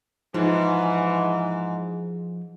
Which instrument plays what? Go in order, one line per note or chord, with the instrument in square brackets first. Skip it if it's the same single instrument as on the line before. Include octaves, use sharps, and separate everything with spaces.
[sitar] G#2 [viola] E3 [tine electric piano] F3